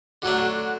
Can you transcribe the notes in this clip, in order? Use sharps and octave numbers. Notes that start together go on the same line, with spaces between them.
D3 F#3 A3 D4 F#4
F#4